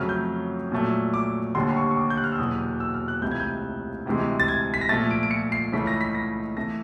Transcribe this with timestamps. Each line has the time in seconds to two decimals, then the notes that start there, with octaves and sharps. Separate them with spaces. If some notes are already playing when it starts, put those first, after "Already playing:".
Already playing: F2 C#3 F#3 A3 F6
0.09 G6
0.72 A#2 F#3 A3
1.14 D6
1.55 D#2 D3 G3 A#3 C6
1.69 C6
1.77 C#6
1.91 C#6
1.97 D6
2.10 G6
2.17 F#6
2.24 F6
2.32 E6
2.39 E2 B2 F#3 A#3 D#6
2.80 E6
2.94 F6
3.08 F#6
3.22 C#2 C3 E3 A3 G6
3.31 G#6
3.40 G6
4.06 D2 C3 E3 G#3
4.40 A6
4.48 G#6
4.74 B6
4.81 A#6
4.89 A#2 F3 A3 A6
5.11 D7
5.23 D7
5.31 C#7
5.52 C7
5.72 C#2 C#3 E3 A3 B6
5.87 A#6
6.01 B6
6.15 A#6
6.57 E3 A3 A#6